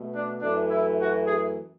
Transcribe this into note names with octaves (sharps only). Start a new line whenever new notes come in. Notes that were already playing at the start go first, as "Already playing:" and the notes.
Already playing: B2 A3
D4
F#2 E3 A3 D4
E4
F#4
G#4